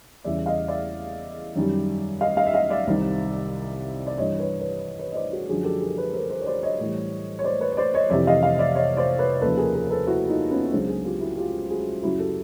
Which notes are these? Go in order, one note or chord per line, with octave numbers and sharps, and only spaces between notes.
E2 C#3 E3 G3 D5 E5
D#5 F5
D5 E5
F#2 D#3 G3
D#5 F5
D#5 F5
E5
D#5 F5
D5 E5
C2 C3 D#3 G3
D5
G2 E3 G3 C#5 D#5
B4 C#5
B4 C#5
B4 C#5
D#5
C5 D5
F#4 G#4
F#2 D3 F3 F#4 G#4
G4 A4
G#4 A#4
A#4
A4 B4
A#4 C5
A#4 C5
C#5
C5 D5
C#5 D#5
A2 E3 G3
C#5
C5 D5
B4 C#5
C#5
C5 D5
C#5 D#5
F2 C3 E3 D5 E5
D#5 F5
D#5 F5
D#5
D5 E5
C#5 D#5
C5 D5
B4 C#5
D#2 C#3 F3 A4 B4
G#4 A#4
G#4 A#4
A4 B4
E4 F#4
D#4 F4
B3 C#4
D#4
C#2 C#3 F#3 C4 D4
F#4 G#4
F4 G4
E4 F#4
F4 G4
F#4 G#4
F#2 C#3 F#3 E4 F#4
G4 A4